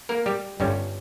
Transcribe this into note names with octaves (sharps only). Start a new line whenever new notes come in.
A#3 A#4
G3 G4
G1 G2 G3 C#4